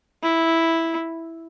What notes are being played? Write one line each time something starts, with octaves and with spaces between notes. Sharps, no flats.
E4